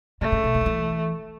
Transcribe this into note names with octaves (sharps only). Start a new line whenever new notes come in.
C#3 A3
C#3
B2
E3
F#3
E3